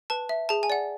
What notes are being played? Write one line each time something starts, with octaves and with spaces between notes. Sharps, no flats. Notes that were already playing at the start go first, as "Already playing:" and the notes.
B4 A5
E5
G#4 A5
G#5
D5 F#5